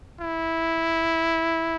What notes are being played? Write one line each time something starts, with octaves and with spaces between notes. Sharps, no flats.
E4